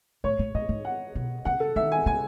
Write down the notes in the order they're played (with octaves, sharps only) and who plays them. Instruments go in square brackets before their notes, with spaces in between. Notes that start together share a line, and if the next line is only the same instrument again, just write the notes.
[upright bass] A2 [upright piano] C#5
[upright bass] A2
[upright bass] A2 [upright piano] D#5
[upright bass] G#2
[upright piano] F#5
[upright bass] B2
[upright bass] C#3 [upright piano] F#5
[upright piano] A4
[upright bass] D#3 [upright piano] E5
[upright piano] G#5
[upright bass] C#3 [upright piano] G#5